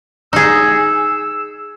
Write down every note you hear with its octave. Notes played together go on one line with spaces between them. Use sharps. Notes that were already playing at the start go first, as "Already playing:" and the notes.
D#4 G#4 E6